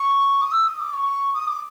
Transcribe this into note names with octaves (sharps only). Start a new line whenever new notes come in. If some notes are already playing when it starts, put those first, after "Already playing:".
Already playing: C#6
D#6
E6
D#6
D6
C#6
D#6
D6